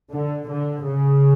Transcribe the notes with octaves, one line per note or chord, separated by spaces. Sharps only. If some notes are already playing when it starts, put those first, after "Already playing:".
D3
D3
C#3